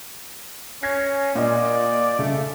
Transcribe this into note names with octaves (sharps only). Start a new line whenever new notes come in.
C#4 G#6 A#6 C7
A#2 D5 D#5
C#3 A3